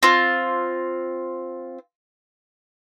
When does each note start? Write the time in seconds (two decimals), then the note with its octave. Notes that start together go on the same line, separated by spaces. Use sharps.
0.03 C4 F4